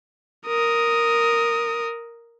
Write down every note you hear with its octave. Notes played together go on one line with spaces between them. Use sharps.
A#4 D#6